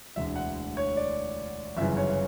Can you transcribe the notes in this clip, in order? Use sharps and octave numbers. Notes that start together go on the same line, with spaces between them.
E1 D2 D3 E5
F#5
C#5
D5
G1 F#2 C#3 E3 E5
C#5